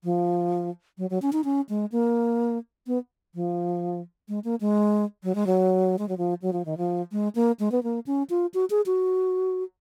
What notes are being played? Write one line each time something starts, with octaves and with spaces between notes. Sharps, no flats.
F3
F#3
F#3
C#4
D#4
C#4
G#3
A#3
B3
F3
G#3
A#3
G#3
F#3
G#3
F#3
G#3
F#3
F3
F#3
F3
D#3
F3
G#3
A#3
G#3
B3
A#3
C#4
F4
F#4
G#4
F#4